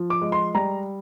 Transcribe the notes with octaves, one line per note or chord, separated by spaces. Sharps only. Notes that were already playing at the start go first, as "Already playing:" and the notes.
Already playing: F3
D6
G#3
C6
G3 A#5